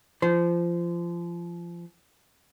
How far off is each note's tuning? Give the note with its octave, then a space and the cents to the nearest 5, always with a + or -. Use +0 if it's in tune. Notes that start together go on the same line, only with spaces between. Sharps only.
F3 -25 C5 -20